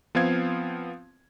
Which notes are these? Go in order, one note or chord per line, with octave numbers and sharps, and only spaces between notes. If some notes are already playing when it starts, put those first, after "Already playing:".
F3 B3 C4 F5 G#6